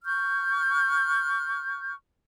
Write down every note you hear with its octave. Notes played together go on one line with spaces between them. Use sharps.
C#6 F6 G6